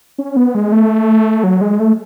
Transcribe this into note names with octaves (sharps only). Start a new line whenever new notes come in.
C#4
B3
G#3
A3
F#3
G#3
A3